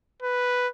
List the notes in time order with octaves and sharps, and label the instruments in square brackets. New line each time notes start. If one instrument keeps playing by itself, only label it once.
[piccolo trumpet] B4